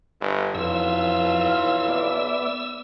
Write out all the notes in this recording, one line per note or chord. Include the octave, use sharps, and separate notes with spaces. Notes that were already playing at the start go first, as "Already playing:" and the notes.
G1
B1 F2 E3 F4 E6
B3 D5 E5